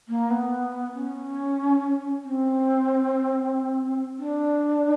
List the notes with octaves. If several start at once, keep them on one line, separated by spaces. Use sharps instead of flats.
A#3
B3
C#4
C4
D4